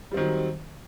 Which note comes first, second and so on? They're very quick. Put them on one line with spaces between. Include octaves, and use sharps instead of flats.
G3 C4 D#3 F#3